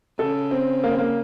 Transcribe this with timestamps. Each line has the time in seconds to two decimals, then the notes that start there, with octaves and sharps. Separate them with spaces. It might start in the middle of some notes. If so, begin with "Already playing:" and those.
0.19 C#3 A4
0.51 C4
0.84 A#3
0.91 C4
0.98 A#3